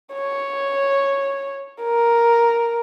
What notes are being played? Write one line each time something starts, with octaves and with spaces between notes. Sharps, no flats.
C#5
A#4